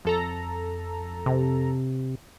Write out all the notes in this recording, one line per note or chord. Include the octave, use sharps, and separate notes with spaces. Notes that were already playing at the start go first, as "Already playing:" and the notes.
F2 A4 A#5
C3